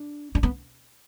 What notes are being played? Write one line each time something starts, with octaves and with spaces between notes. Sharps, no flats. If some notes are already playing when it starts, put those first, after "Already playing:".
Already playing: D4
D4
B3